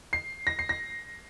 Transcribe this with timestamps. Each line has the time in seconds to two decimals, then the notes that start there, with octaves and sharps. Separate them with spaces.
0.13 C7
0.47 A#6
0.59 C7
0.69 A#6